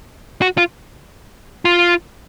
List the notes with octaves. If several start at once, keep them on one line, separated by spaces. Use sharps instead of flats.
F#4
F4
F4